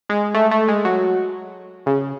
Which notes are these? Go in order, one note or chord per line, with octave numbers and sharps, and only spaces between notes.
G#3
A3
A3
G#3
F#3
C#3